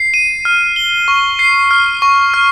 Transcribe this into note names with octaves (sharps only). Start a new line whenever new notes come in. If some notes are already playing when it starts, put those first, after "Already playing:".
Already playing: C7
D#7
F6
G7
C#6
C7
F6
C#6
F6